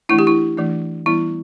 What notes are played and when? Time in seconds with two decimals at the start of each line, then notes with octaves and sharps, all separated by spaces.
0.09 E3 A3 D4 E4
0.19 G4
0.27 E4
0.57 E3 A3 D4
1.06 E3 G3 B3 E4